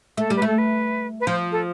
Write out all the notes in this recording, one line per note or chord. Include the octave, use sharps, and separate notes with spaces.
A3 A4
G3
B4
A3 A4
B4
B4
F3 C5
A4